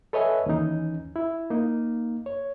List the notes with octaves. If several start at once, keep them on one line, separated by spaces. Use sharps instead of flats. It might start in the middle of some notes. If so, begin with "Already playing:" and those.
A4 B4 C#5 D#5 E5 G#5
D#2 E3 C#4 D#4
E4
A#3 D#4
C#5